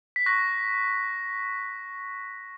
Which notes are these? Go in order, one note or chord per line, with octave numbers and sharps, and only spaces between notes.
B6
C#6 F#6 A#6